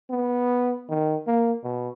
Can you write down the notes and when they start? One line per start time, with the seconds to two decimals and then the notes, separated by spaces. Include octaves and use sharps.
0.10 B3
0.89 D#3
1.27 A#3
1.64 B2